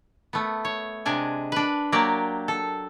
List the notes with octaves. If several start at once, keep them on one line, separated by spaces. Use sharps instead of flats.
A3 B3
C#5
C3 G#3 D4 G#5
D4 B4
F#3 A#3 G4 D5
A4